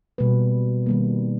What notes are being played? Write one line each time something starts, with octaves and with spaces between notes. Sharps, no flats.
B2 G3 A#3 B4
D#3 G3 A#3